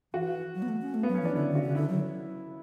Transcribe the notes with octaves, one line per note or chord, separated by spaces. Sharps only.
E3 F#4
F#3
B3
A3
C#4
A3
F#3 B3
C#4
E3 D4
D3 E4
D3
F#4
C#3
D3 E4
F#3